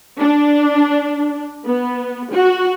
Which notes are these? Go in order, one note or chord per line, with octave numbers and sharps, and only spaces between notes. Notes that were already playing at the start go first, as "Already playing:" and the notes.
D4
B3
F#4